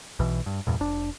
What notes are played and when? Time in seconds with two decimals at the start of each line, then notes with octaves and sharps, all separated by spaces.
0.19 B1 B2 E3
0.46 G2
0.67 E2 G2 A#2
0.80 F1 D4